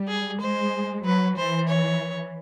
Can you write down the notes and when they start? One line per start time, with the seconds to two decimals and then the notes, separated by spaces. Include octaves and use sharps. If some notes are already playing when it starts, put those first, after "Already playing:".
Already playing: G3
0.08 G#4
0.40 G#3 C5
1.05 F#3 B4
1.37 E3 C5
1.69 C#5